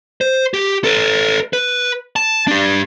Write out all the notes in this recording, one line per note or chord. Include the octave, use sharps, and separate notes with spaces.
C5
G4
A4 B4
B4
A5
D4 G4